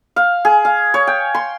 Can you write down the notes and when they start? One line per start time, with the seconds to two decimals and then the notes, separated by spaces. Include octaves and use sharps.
0.16 F5
0.45 G#4
0.65 F5
0.94 C#5
1.07 G5
1.35 C6